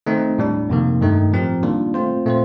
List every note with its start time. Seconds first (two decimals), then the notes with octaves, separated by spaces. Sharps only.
0.06 D#3 A3 C4 D#4
0.38 A2 G3 D4
0.69 F2 C3 D#3 A#3
1.00 G2 D#3 A3 D#4
1.32 A2 F3 C4 G4 A#4
1.63 D#3 G3 A#3 D4 F4
1.94 A3 C4 F4 C5
2.25 A#2 A3 C4 F4 C5